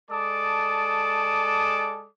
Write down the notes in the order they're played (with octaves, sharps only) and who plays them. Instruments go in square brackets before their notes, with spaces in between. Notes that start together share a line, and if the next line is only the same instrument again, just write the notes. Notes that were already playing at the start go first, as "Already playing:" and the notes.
[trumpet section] G#3 A4 D5 A5 D6 D#6